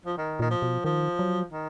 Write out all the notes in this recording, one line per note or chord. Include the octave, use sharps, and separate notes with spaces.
F3
D#3
A#2 D#3
F3
B2
D#3 F3
F#3
D#3